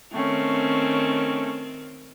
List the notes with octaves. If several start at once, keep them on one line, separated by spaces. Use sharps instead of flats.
D#3 A3 C4 C#4